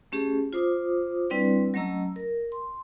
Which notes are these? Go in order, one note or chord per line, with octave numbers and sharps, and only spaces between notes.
A3 C#4 G4 G#4
F4 C5 D6 D#6
G3 C4 D4 E4 B4 D5
F#3 A3 C#4 D#5 A#5 E6
A#4
C6